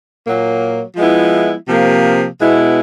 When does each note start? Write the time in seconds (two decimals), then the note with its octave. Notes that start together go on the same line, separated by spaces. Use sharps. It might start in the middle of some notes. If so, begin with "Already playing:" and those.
0.25 A#2 F#3 A#3
0.96 F3 G#3 B3 E4
1.68 C3 F3 A#3
2.40 B2 G#3 B3 E4